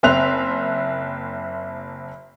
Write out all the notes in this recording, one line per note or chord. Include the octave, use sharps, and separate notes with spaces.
F#1 C4 E5 C6 F#6 F7